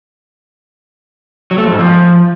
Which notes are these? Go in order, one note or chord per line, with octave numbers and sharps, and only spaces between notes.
F#3
A3
F2
G#2
F3